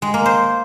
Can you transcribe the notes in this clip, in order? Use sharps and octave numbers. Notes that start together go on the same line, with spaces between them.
G#3
A#3
C5